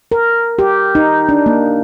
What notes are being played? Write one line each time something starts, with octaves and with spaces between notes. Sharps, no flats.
A#4
G4
D#4
D4
A#3